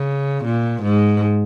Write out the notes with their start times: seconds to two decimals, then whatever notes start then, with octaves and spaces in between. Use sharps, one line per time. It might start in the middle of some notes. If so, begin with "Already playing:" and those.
Already playing: C#3
0.44 A#2
0.82 G#2